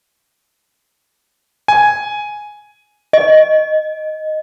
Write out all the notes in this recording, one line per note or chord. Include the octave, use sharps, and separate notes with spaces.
G#5
D#5